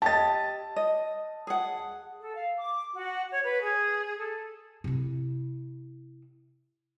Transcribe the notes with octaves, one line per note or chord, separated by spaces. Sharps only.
G4 D#5 A5 A6
D#5
G#4 F#5
A4
F5
D6
F#4
C#5
B4
G#4
A4
C3 E4